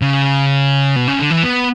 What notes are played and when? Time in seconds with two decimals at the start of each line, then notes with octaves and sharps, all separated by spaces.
0.02 C#3
0.96 B2
1.08 C#3
1.19 D3
1.31 E3
1.43 B3